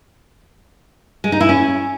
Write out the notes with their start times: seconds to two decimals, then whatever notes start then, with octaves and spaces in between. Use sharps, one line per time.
1.24 G#3
1.32 D#4
1.41 E4
1.49 C#4